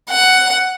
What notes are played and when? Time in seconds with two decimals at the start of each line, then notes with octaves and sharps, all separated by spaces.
0.10 F#5